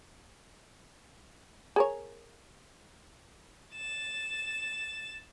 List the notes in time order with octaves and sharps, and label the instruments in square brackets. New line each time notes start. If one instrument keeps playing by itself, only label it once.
[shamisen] G#4 A#4 C#5
[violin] A6 E7